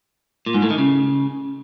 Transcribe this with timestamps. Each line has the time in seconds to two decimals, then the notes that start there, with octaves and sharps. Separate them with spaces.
0.46 A#2
0.54 G#2
0.62 A2
0.70 D#3
0.78 C#3